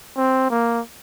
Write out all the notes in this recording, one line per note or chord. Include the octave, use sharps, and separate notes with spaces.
C4
A#3